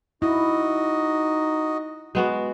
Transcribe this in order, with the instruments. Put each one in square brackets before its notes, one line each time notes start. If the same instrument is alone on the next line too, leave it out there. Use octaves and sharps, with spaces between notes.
[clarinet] D#4 [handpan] E4 [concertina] F#4 D#5
[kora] G#3 B3 F#4